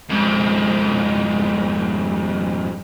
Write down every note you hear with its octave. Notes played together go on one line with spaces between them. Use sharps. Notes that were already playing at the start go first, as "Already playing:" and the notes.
F2 G#2